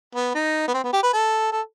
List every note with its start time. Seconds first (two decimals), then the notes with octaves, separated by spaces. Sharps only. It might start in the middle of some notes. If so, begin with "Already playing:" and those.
0.15 B3
0.35 D#4
0.68 B3
0.74 C4
0.84 B3
0.93 G4
1.03 B4
1.13 A4
1.52 A4